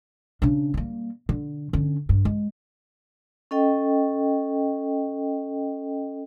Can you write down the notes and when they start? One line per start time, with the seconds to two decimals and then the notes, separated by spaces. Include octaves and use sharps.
0.42 C#3 D4
0.74 G3 A#3
1.29 D3
1.73 D3 C#4
2.09 G2
2.25 G#3
3.51 C#4 A4 D#5 G5